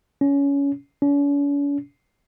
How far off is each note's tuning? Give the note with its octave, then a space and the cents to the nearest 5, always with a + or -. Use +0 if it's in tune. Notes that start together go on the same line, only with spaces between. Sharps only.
C#4 +20
C#4 +45